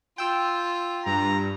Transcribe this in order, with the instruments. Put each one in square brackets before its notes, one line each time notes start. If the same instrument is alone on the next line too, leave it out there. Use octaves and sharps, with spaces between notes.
[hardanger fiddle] F4 [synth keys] G5 E6
[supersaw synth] G2 [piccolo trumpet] A#5